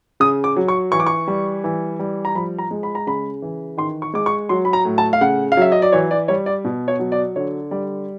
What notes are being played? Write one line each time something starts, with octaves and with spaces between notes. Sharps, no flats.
C#3 D#6
D6
F#3
C#6
E3 C#6
D6
C#6
G3
E3
G3
A#5
F3 B5
A#5
G#3
B5
A#5
C#3 B5
E3
D#3 C6
C#6
G#3 D6
C#6
F#3 C6
B5
A#5
A2
A5
F5
C#3 F#5
F5
F#3 E5
D#5
D5
E3 C#5
D5
G3 C#5
D5
B2
C#5
F#3
D5
D3 C#5
G3 D5